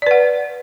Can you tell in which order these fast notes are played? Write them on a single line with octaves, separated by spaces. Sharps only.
D5 B4 F#5